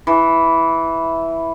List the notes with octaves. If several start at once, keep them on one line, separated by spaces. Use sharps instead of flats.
E3